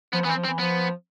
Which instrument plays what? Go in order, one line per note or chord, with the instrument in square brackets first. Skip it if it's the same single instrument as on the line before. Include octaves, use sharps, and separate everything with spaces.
[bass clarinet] F3 [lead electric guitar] B3
[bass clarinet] E3 [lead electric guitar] B3
[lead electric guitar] C4
[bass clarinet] F3
[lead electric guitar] C4
[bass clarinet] E3
[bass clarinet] F3 [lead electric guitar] B3